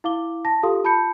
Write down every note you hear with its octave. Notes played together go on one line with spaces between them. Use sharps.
E4 F5 D6 G7
A5 A#6
F4 G4 A4 F5 C6 D#6
F4 A5 B5 G6 C#7